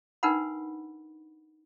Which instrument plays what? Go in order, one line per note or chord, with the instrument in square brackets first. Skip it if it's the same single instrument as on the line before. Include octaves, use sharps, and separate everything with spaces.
[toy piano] D4 D#4 A#4 B4 F#5 B5